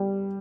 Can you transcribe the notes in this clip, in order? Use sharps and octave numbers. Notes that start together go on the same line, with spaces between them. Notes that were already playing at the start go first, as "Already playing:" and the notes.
Already playing: G3